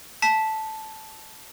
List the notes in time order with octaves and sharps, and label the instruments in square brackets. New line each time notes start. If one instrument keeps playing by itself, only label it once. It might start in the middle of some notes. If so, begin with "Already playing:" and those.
[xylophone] A5 B6